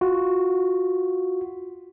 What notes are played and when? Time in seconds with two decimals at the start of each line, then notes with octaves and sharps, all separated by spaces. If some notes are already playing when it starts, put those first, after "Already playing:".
0.01 F4 F#4